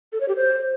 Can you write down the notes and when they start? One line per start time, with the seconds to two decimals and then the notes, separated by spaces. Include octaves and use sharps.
0.13 A4
0.20 C#5
0.28 G4
0.36 C5